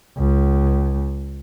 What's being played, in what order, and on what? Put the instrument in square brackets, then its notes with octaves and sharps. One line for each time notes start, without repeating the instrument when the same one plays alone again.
[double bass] C#2